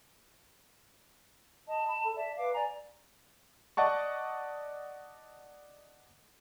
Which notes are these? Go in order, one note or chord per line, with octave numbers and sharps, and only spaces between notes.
D#5 A5
B5
A4
D5 E5 A5
B4 F5 D6
D5 G#5 A#5
D5 D#5 F#5 A5 C#6